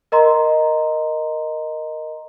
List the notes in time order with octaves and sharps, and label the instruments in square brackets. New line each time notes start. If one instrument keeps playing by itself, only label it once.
[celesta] A#4 D#5 A#5 C6